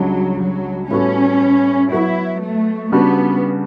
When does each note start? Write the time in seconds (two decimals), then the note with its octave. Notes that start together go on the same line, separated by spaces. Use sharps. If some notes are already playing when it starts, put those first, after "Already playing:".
Already playing: C#2 C#3 F#3 G3 D4
0.40 F#3
0.90 A2 G3 B3 C#4 F#4 A4
1.92 F#3 B3 E4 F#4
2.42 A3
2.92 C#3 G3 B3 D4 F#4